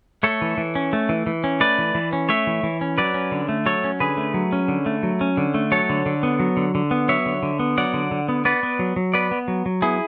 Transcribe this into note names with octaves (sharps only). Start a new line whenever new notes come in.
A3 A4 C#5
E3
E3
C#4
A3
E3
E3
C#4
A3 B4 D5
E3
E3
C#4
A3 C#5 E5
E3
E3
C#4
F#3 B4 D5
C#4
D3
A3
F#3 A4 C#5
C#4
D3 G#4 B4
A3
F#3
C#4
D3
A3
F#3
C#4
D3
A3
F#3 A4 C#5
D3
D3
B3
F#3
D3
D3
B3
F#3 C#5 E5
D3
D3
B3
F#3 D5 F#5
D3
D3
B3
B3 B4 D5
B3
F#3
F#3
B3 B4 D5
B3
F#3
F#3
B3 E4 G#4